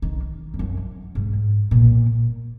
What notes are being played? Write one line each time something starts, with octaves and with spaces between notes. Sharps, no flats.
D#3
F2
F#2
G#2
A#2